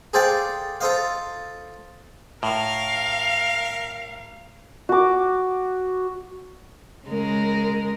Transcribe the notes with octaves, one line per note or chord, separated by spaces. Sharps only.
G#4 A4 C5 D5 F5 G5
F4 A4 C5 D#5 F5
A2 A#4 F5
F#4 D6
C#3 G#3 A#4